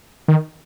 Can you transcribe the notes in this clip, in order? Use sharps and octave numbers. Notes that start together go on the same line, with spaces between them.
D#3